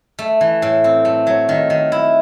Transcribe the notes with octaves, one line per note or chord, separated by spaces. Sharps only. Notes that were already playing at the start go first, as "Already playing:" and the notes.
A3
E3
A2
C4
A3
F#3
D#3
D#3
E4